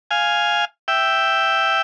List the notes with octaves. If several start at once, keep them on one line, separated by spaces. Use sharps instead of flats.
F5 G#5
E5 G5